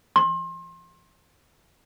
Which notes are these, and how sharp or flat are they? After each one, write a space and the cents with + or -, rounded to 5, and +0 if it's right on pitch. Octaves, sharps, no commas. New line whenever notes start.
C6 +30